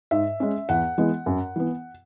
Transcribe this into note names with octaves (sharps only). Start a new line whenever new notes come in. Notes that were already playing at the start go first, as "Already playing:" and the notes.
G#2 E5
G#3 C#4
E2 F#5
E3 G#3 B3
F#2
E3 B3